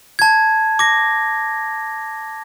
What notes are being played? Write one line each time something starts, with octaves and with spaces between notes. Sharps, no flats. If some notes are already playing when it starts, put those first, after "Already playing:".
A5 G#6
D6 A#6